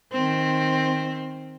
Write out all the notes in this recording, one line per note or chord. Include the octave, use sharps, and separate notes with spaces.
D#3 C4